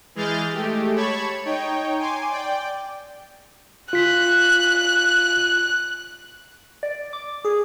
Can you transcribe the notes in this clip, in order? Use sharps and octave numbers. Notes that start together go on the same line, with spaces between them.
E3 G#3 G#4 F6 G6 A6
G#3 A3 G4
C#5 A5 B5 C#6 G#6
D#4 C#5 G5
G#5 C6 D6
D5 G5
F4 F#6 B6
D5
D6
G#4